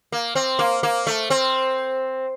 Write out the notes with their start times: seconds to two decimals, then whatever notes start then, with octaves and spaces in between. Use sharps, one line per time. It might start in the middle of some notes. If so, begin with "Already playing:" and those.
0.12 A#3
0.35 C4
0.59 A#3
0.83 A#3
1.07 A3
1.30 C4